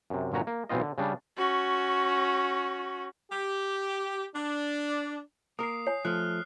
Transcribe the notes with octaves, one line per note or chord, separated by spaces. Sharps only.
F#2 C3
G1 A#2 C#4 F#4 A#5
A#3
B1 B2 E3 C4 F4 D#5
D3
C#3 G3 D4
C#4 F#4
G4
D4
A#3 A#4 D#6 C7
C#5 G#5 C7
F3 A3 F6 F#6